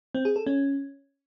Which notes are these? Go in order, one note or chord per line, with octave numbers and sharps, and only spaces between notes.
C4
G#4
A4
C#4